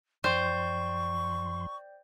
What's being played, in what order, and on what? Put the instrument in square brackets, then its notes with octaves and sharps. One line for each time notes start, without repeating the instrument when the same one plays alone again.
[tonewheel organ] F#2 F3 C6 [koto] C5 [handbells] D5 G5 G6 [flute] C#6